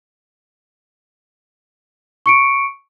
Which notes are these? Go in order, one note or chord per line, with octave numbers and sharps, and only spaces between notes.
C#6 C#7 D7